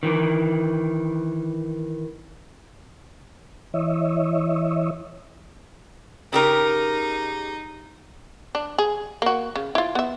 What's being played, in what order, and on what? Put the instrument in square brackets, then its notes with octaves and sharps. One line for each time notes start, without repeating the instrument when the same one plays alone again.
[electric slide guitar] D#3 E3
[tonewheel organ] E3 C#5 D#5 E5
[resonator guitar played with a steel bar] C#3 G4 A#4 [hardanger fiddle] D#4
[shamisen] D4
G#4
A#3 F#4
C#3
E4 F4
B3 E5